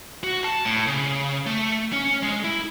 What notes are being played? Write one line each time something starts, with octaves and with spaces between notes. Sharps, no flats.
F#4
A5
A2
C#3
A3
C#4
G#3
E4